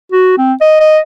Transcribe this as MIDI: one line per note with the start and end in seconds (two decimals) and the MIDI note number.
0.12 0.35 66
0.38 0.53 60
0.61 0.76 75
0.80 0.99 75